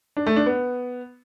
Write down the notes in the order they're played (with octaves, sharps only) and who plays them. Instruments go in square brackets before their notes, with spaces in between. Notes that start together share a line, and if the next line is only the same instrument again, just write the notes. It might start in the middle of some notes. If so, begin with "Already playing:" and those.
[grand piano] D4
A3
D4
B3